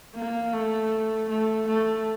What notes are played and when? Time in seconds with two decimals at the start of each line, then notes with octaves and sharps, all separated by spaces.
0.15 A#3
0.53 A3
1.30 A3
1.68 A3